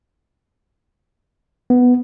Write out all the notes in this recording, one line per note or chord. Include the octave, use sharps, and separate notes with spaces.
B3